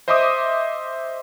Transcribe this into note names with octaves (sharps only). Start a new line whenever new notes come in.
C5 D#5 E5 C6 D6 D#6